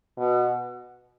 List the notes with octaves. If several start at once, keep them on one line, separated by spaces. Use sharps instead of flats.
B2